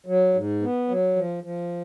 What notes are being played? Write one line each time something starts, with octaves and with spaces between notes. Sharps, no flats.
F#3
G#2
B3
F#3
F3
F3